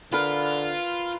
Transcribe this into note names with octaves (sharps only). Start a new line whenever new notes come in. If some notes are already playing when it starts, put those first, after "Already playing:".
D3 F4 A#4 B4